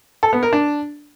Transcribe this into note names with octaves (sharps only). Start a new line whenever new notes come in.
A4
B3
A#4
D4